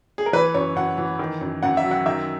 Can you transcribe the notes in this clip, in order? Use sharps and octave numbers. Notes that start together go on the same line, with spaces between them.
G#4
A#4
E3 B4
F#2 C#5
F#2 F#5
E3
D#3
F#2
F#2 F#5
E5
F#3
F#5
D#3 E5